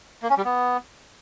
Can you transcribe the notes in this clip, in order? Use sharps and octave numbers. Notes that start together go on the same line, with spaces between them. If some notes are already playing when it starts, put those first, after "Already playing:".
A#3
C#4
G3
B3